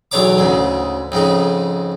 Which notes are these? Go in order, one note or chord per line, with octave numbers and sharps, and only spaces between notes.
B1 E2 D4 C#5 A#5 D6
D2 G#2 C#3
F2 G#2 C#3 D#4